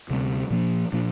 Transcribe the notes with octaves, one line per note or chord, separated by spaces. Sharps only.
D2 C3 G3 C4
A#2 F3 A#3 D4
A#2 F3 A#3 D4